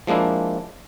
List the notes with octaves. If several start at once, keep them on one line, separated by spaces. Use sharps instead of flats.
F3 G#3 A#3 D4 E4